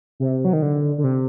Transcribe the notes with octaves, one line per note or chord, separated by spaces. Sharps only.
C3
F#3
D#3
D3
D3
C3